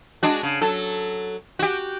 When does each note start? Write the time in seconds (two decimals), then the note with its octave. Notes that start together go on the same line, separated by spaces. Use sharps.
0.23 G#3 D4 F#4
0.43 C#3
0.61 F#3 A4
1.59 F#4 G4